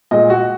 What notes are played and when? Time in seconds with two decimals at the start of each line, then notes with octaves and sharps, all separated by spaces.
0.11 A#2 G#3 D#5
0.30 F#4